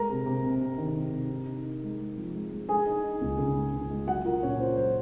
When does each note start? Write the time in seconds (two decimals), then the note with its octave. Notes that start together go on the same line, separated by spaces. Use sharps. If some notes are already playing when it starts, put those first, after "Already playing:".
Already playing: G#3 A#4 A#5
0.10 C3
0.26 C3
0.44 C3
0.61 C3
0.78 D#3
0.96 C3
1.13 C3
1.30 D#4
1.47 D#4
1.65 D#4
1.83 G#3
1.99 G#3
2.17 F3
2.35 G#3
2.51 G#3
2.69 G#3 G#4 G#5
2.86 D#4
3.03 D#4
3.21 C#2
3.38 C#3
3.55 G#3
3.73 C#3
3.91 G#3
4.07 F#3 F#4 F#5
4.25 F4 A#4
4.42 A#2 C#4 C#5
4.59 F4 C5
4.76 F#3 C5